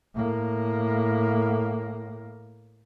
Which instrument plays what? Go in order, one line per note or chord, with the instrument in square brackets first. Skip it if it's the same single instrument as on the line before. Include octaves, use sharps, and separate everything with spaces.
[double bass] A2 A#3